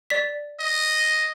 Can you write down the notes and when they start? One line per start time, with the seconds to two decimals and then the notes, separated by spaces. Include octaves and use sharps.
0.10 D5 B6
0.59 D#5